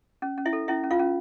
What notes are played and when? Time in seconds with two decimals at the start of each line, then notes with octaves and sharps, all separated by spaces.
0.22 C#4
0.38 C#4
0.45 E4 E5
0.53 A4
0.68 C#4 E4 E5
0.84 C#4
0.91 F4 F5
0.99 C#4